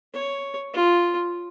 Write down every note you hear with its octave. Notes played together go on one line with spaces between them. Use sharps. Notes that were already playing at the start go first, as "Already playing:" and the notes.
C#5
F4